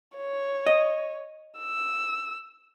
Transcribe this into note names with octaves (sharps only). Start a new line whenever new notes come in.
C#5
D#5
E6